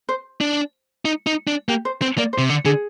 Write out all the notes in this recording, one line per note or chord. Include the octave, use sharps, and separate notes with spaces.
C5
D4
D#4
D#4
D4
A#3 G4
C5
C4 C5
A#3 D5
C5
C3
D3
D3 G#4